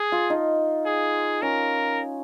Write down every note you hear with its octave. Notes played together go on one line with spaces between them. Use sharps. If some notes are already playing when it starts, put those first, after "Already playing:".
Already playing: G#4
F4
D#4
G#4
C#4 A#4